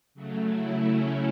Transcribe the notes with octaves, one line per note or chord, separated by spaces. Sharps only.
C#3 F#3 A3
E4
C#4